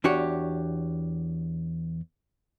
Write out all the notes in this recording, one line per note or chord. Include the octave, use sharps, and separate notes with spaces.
E2 D4 F#4 G4 C#5